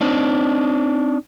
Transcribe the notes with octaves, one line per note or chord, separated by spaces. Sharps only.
C4 D4 D#4